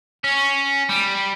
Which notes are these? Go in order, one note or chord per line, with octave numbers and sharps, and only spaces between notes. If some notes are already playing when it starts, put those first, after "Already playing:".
C#4
G3